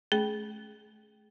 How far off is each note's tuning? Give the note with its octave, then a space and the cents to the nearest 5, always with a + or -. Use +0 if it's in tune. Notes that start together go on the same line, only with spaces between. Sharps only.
A3 -35 C#4 +0 G#4 +15